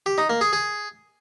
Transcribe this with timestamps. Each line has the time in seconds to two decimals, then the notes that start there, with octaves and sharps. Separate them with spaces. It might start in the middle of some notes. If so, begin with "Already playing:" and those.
0.06 G4
0.18 D#4
0.30 A#3
0.41 G#4
0.53 G#4